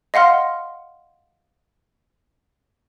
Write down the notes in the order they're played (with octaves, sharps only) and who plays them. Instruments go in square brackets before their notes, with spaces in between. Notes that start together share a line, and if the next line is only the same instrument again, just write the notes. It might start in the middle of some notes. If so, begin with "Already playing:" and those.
[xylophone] D#5 F5 F#5 C6 F6